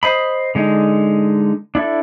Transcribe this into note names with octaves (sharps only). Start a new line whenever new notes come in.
C5 D#5 B5
D3 G#3 D#4
D4 E4 A4